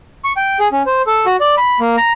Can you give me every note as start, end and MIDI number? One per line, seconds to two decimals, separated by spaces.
0.24 0.32 85
0.37 0.58 79
0.59 0.68 68
0.72 0.83 61
0.86 1.02 72
1.07 1.26 69
1.26 1.37 66
1.40 1.55 74
1.57 1.79 83
1.80 1.96 58
1.97 2.12 82